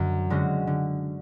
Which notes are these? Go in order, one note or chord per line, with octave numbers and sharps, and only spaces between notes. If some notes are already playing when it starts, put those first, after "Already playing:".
Already playing: F#2 D3 C#4 F#4
D3 G#3 C#4 F#4
D3